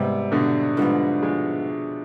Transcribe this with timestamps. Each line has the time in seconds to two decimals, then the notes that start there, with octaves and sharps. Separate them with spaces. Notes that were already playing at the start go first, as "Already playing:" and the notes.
Already playing: G#2 C3 G3 B3
0.32 B2 D3
0.77 G#2 D3 F3 G3 B3
1.23 F3 G#3